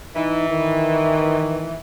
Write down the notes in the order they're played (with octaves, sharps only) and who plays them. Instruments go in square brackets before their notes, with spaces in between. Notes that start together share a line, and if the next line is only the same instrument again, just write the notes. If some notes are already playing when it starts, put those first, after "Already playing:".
[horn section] E3 [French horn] D#4
[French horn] D#3